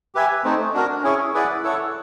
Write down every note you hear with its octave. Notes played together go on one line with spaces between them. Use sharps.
G4 B4 E5 G#5
A3 C4 D#4
D4 F#4 A#4
C#4 E4 G#4 C#5
E4 G#4 B4 D5 F#5
E4 A4 C#5 F#5